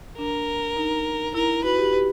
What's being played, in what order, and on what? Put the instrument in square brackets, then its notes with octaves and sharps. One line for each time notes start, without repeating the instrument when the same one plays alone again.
[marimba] D4 [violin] A#4
[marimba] D#4
[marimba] E4 [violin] A#4
[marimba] F#4 [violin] B4
[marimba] G4
G4